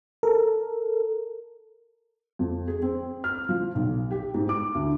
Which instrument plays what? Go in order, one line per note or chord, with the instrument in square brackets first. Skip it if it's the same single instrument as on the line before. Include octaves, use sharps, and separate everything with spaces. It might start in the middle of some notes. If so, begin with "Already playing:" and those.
[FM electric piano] A4 A#4
[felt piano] F2
G#4
C4
F6
F3
B1
G4
G#2
D6
D2